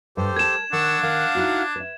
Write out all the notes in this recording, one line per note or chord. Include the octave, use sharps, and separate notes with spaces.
G2 G4 A4 C5
A#4 A5 G#6 E7
D#3 D4 F#5 C#6 E6
D#3 F5 F#5
D#4 E4 F#4
B4 E5